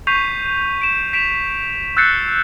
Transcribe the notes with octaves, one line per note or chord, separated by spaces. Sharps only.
C#6 G6 B6 C7 D#7 F7
D7 E7
B6 D7 E7 F7
E6 F#6 G6 A6 C7 C#7